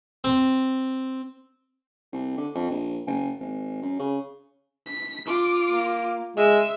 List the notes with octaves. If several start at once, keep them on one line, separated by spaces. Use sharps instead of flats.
C4
C2
D3
F2
A#1
F#1
G#1
F#2
C#3
B6
F4 D6
A#3
G#3 E5